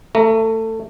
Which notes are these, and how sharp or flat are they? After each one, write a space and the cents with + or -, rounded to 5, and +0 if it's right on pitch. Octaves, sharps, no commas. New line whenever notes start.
A3 +20 A#5 +0